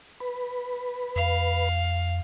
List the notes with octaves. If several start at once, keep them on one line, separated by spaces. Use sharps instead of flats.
B4
F2 F5